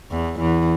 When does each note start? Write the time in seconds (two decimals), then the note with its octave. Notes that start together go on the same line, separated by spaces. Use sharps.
0.11 E2 E3
0.40 E2 E3